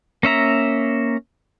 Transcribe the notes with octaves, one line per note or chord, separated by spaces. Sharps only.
A#3 C#4 E5 A#5